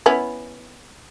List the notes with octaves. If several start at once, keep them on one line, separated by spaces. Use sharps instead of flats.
B3 C#4 E4